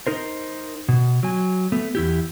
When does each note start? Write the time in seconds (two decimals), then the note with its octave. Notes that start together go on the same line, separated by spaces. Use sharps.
0.07 D#4 A#4 C5
0.89 B2
1.23 F#3 G#5
1.72 A3 B3
1.95 E2 E4 G4